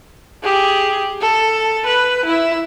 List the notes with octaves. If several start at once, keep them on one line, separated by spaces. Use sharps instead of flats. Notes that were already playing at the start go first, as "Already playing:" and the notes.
G4 G#4
A4
B4
E4 E5